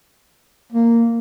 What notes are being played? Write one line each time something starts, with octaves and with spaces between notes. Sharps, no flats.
A#3